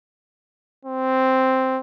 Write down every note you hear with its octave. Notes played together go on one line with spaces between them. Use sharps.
C4